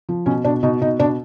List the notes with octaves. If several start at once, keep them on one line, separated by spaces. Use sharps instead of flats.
F3
B2 C#4
B2 D4
B2 D#4
B2 D#4
B2 D4